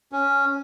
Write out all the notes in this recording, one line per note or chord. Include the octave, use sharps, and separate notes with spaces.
C#4